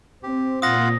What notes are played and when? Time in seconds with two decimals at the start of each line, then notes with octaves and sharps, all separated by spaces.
0.23 C4 G4
0.62 A#2 F4 F5 F#5 D#6 A#6